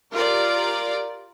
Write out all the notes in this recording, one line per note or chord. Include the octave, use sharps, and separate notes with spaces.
F4 G4 A#4 D5